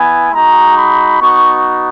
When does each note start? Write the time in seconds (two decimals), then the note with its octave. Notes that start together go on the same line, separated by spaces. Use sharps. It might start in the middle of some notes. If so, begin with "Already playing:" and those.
Already playing: B3 E4 G#5
0.32 G#3 D#4 F#4 A#5
0.76 B5
1.20 B3 D#4 F#4 C#6